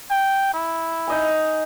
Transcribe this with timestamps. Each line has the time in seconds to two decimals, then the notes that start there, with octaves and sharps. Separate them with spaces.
0.10 G5
0.54 E4
1.07 D#4 D#5 G#5